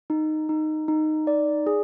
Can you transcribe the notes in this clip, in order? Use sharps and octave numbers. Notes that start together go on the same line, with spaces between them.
D#4
D#4
D#4
D5
G#4